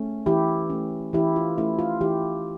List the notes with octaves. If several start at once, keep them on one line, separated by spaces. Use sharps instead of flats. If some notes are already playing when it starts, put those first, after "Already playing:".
Already playing: A3 C#4
E3 E4 G4
A3 C#4
E3 E4 G4
F4
A3 C#4 E4
F4
E3 E4 G4